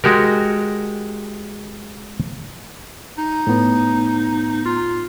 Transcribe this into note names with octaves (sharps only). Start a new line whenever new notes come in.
G#3 F#4 G4 A#4
D#4
A2 B3
F4